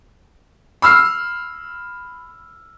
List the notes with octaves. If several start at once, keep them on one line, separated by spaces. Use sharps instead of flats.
B5 E6 F6 C7